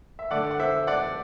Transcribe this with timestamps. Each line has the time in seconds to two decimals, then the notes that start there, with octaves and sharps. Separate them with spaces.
0.19 E5
0.31 D3 A3 D5 F#5
0.51 F#5
0.60 C5 E5
0.87 D5 F#5